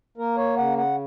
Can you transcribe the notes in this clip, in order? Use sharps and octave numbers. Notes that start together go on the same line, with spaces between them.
A#3 A#4
C#5
C#3 F#5
F#5